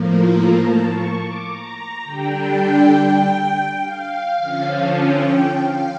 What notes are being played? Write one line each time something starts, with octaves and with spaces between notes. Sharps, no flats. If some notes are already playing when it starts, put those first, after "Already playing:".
Already playing: A2 F3 A#3
A#5
A5
C#6
D6
A#5
D3 G3 D4 G5
G5
F5
D3 F3 C#4 F5
A5
G5
F5